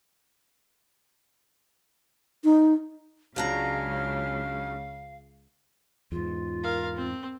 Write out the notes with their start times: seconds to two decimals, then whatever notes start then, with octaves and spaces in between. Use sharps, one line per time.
2.44 D#4
3.36 C#2 C#3 F#3 D4 F5 A#5 F6
6.12 E2 G#2 F4
6.63 A#4 F5
6.97 C4